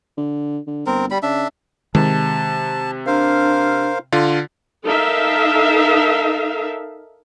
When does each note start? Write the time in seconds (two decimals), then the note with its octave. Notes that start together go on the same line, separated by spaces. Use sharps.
0.17 D3
0.67 D3
0.87 G1 C4 A#4
1.11 G3 B5
1.23 C#3 D4 E5
1.95 C3 D#3 G#3 A5
3.06 D4 A#4 C5 F5
4.12 D3 F4
4.86 D#4 A4 A#4 E5 F5